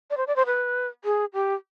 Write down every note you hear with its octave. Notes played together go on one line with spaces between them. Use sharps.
D5
C5
D5
C5
B4
G#4
G4